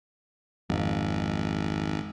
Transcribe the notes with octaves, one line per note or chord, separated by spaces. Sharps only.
G#1 F2 G#2